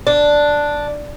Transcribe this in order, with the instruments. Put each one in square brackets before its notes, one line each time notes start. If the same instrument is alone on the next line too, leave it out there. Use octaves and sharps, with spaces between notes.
[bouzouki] D4